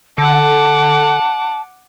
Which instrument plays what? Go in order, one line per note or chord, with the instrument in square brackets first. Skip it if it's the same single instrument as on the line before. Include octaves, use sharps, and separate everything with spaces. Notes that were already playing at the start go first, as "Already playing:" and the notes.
[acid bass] D3 [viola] F#5 D6 [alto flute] A5